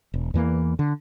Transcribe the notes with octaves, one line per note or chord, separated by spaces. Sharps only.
E1
E2 E3 A#3
D3